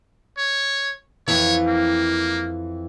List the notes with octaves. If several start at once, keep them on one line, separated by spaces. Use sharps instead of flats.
C#5
F2 E3 C#5
A#3